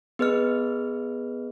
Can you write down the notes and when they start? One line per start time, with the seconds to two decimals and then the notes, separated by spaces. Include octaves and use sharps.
0.19 B3 G#4 B4 D#5 F6